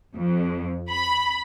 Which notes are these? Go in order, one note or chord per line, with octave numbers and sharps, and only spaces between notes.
F2
B5